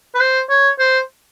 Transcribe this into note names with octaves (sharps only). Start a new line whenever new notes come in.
B4
C5
C#5
C5